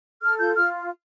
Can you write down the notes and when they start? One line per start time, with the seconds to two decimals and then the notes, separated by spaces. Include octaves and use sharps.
0.22 A4 F6
0.39 F4 G6
0.55 F4 F6